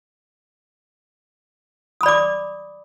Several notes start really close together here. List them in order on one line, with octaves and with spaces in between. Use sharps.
D#6 B5 D5 D6